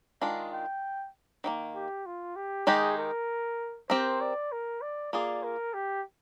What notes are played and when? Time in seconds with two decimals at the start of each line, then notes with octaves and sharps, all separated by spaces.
0.21 D#3 G#3 D4 F4 D#5
0.53 G5
1.44 D#3 G3 A#3
1.75 G4
2.06 F4
2.36 G4
2.67 D#3 G#3 D#4 G4 G#4
2.98 A#4
3.90 C4 G4 A#4 C5
4.21 D5
4.52 A#4
4.81 D5
5.13 A#3 F4 G#4 D5
5.43 A#4
5.74 G4